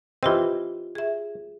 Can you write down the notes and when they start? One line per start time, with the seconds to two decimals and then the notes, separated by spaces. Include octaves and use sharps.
0.23 E3 C4 F4 G4 D#5
0.95 G#4 E5